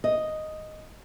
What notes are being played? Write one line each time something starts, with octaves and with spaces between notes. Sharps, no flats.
D#5